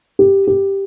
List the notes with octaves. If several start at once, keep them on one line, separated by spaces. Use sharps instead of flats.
G4
G4